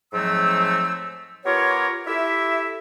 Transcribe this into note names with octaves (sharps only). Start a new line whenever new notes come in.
G#2 F3 F#3 A3 C4 E6
B3 F4 G4 A#4 C#5
E4 G4 A4 E5